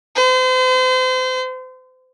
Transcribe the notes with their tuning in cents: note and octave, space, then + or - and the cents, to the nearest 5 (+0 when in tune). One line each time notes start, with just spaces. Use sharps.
C5 -35